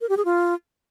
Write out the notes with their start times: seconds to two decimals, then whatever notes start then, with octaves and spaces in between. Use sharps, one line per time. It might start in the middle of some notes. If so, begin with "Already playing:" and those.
0.01 A#4
0.09 G4
0.17 G#4
0.25 F4